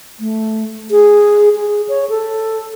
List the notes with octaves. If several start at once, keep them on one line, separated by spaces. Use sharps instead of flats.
A3
G#4
G#4
C#5
A4